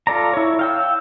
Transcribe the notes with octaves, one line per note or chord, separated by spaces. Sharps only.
F4 A4 D5 A#5
E4 C#5
F5 G5 E6